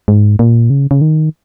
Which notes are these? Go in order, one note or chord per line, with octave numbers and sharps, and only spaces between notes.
G#2
A#2
C#3
C#3
D#3